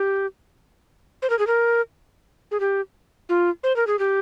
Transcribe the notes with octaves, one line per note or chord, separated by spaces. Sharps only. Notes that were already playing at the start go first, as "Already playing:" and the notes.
Already playing: G4
C5
A#4
G#4
A#4
G#4
G4
F4
C5
A#4
G#4
G4